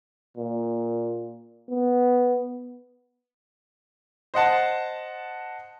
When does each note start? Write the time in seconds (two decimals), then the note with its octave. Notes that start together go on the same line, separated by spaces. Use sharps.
0.37 A#2
1.70 B3
4.34 C5 D#5 F#5 A5